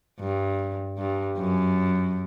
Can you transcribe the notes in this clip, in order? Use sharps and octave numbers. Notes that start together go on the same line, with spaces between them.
G2
G2
F#2